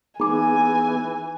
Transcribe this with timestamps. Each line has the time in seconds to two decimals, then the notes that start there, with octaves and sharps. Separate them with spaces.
0.20 E3 B3 D#4 G#4 G#5 D6